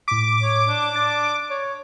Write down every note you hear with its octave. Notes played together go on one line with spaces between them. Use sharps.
A2 D6 B6
C#5
D4
D4 A6
C#5